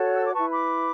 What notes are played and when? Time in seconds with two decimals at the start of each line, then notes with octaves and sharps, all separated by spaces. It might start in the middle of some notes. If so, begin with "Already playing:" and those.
Already playing: F#4 A4 C#5
0.16 E6
0.25 D6
0.33 E4 B4 A5 C#6
0.51 B5 D6